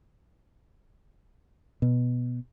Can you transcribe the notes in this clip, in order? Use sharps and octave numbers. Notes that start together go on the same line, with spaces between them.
B2